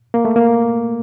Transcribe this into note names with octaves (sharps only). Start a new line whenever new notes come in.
A#3
A3
A#3